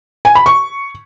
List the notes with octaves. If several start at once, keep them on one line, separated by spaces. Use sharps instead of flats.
G#5
B5
C#6